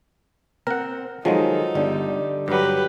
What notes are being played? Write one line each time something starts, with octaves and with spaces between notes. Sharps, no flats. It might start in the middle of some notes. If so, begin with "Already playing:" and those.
C4 A#4 F#5
D#3 F3 F#3 G#3 D#4 G#4 A4
G1 D3 G3
G2 F#3 G4 B4